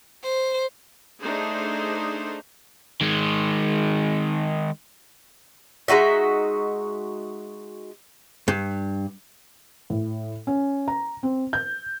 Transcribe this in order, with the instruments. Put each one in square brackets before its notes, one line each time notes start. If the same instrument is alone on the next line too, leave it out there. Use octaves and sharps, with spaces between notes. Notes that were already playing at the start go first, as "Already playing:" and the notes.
[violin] C5
[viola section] A3 D4 D#4 G#4 C5
[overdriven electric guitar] D#3 G#3
[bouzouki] G#3 D#4 F#4 E5
[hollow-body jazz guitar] G2
[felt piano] A2
C#4
A#5
C4
G6